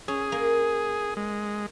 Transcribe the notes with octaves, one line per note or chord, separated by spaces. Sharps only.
C#4 G#4
A#3
G#3